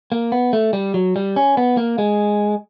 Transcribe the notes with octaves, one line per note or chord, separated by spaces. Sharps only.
A#3
B3
A3
G3
F#3
G3
C#4
B3
A#3
G#3